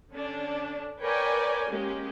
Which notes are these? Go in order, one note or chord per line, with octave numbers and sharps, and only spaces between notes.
D3 C#4 D4
A#4 B4 C#5 D5 G5 G#5
G#3 A#3 C#4 G4